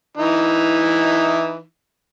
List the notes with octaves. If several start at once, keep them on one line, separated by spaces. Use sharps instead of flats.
E3 D#4 E4